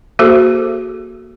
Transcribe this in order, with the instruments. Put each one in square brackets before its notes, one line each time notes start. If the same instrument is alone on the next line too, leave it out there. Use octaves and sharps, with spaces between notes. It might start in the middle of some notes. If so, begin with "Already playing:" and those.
[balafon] A#3 F#4 G#4 A4 C5